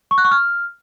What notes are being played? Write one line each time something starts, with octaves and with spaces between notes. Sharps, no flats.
C#6
F#6
C#6
F6